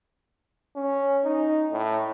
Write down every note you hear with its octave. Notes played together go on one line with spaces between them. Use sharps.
C#4
D#4
A2